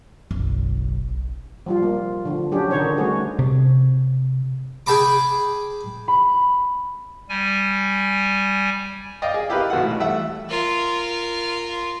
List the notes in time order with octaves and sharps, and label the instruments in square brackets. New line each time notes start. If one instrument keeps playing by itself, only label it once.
[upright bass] F#1 B1
[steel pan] F3 G3 F4
A#3
D3 F3
F#3 C#4 D4 G4 G#4
D3 D#3 C#4 D#4 C5 C#5
G3 A3 F#4 G#4
[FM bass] C3
[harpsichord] G#4 G5 A5 B5 D6
[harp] B5
[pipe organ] G3 G#5
[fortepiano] D5 D#5 F5 G5 D6
G#4
E4 G4 A#4 B4 D#5 F5
G#1 B2 A4 F#5
A2
E2 G3 A3 E5 F#5 E6
[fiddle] F4 A#4